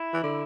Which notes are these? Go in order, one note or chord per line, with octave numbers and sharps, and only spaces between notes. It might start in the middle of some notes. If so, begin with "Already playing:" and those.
Already playing: E4
E3
D3